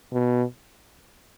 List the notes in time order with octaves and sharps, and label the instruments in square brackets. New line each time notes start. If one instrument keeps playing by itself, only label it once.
[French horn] B2